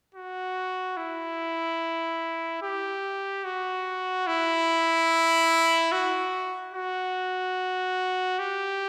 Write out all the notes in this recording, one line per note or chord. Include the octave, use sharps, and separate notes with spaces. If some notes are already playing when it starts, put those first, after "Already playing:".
F#4
E4
G4
F#4
E4
F#4
F#4
G4